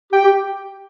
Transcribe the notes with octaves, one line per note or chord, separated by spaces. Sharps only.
G4 G5
G4